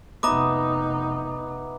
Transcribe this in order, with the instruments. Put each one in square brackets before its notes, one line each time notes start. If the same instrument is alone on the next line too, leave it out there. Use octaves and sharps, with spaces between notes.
[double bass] F1 D#4 [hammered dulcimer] B3 D#5 E5 [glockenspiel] A#5 D6